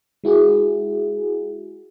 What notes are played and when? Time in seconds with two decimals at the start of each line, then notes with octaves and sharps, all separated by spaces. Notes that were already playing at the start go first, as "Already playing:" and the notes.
0.24 G#3 E4 F#4 G#4